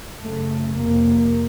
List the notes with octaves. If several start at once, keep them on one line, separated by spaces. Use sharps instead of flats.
F#2 C#3 A3
F2 C3 A#3